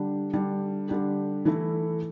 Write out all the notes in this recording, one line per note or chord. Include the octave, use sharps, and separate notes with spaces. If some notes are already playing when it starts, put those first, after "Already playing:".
Already playing: D3 G3 D4 G4
D3 G3 D4 G4
D3 G3 D4 G4
E3 A3 E4